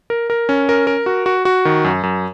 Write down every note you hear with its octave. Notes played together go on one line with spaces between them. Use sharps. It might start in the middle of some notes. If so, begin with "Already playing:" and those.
A#4
A#4
C#4
A#4
A#4
F#4
F#4
F#4
D#3
F#2
F#2